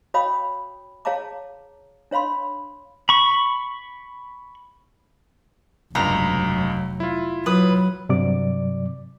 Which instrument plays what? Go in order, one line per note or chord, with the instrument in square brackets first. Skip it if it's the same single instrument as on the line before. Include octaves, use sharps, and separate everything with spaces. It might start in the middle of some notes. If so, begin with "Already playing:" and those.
[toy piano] F#4 C#5 F5 G5 B5 D#6
G#4 C#5 F5 A5 A#5 D6
D4 C#5 F5 B5 C6
[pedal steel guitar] B5 C#6
[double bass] F1 F#3 [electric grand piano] C#2 G2 [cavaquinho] A#5
[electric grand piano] E4 F4
[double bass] F#3 [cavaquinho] B4 D#6
[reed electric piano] G2 C3 F#3 D5 D6